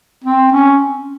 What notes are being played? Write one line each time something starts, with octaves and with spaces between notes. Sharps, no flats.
C4
C#4